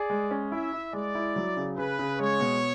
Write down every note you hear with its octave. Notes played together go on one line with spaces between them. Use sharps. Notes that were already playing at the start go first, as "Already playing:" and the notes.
Already playing: G#4 D5
G#3
C#4
E4 E5
E4
G#3 D5
E4
F#3
C#3
C#3 B4
C#3
G#3 C#5
B2